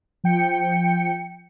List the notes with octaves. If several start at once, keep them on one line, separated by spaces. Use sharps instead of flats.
F3 G5 C#7